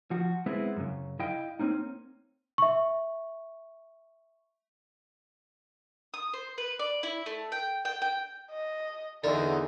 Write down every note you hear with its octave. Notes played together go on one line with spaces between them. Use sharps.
F3 F#4
G#3 B3 C4 E4
F#2 C#3
E4 D#5 F5 G5
A#3 C4 C#4 D#4
E5 C#6
D#6
C5
B4
D5
E4
A3
G5
G5
G5
D#5
E2 D3 D#4 A#4 D5